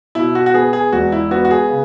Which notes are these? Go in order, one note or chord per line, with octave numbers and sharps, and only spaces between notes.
B2 E4
F#4
F#4
B3 G#4
G#4
E1 F#4
E4
B3 F#4
F#4
G#4
C#3